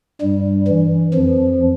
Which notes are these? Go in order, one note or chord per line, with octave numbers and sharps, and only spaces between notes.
G2 G3
E3
F2 F3